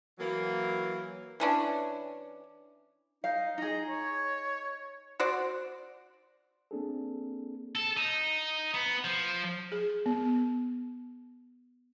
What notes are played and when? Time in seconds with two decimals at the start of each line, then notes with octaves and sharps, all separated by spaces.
0.19 E3 F#3 A#3
1.40 E3 C#4 D4
3.24 D#4 F5
3.58 D#4 G#4 A#5
3.89 C#5
5.20 F#4 C5 D5
6.71 A#3 C4 D4 G#4 A4
7.75 A4
7.97 D#4
8.74 B3
9.04 F3
9.72 G#4
10.06 B3